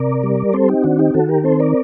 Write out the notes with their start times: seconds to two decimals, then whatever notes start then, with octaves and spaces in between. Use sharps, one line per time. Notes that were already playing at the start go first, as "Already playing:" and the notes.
Already playing: C3 A#4 D5
0.23 G3
0.53 C4 A4 C5
0.69 D#4 G4
0.83 D#3 D4 F#4
0.99 D#4 G4
1.14 D#3 F#4 A4
1.29 G4 A#4
1.44 C4 A4 C5
1.60 A#4 D5